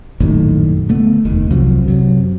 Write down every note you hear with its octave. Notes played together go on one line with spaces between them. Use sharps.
A#1 F#2 A2 D#3
D3 A3 B3
F1 D#2 D#3
C2 C3 F3 F#3
F#2 C3 F#3